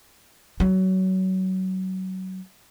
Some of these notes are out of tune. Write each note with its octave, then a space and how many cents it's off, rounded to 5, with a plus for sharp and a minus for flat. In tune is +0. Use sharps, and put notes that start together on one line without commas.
F#3 +25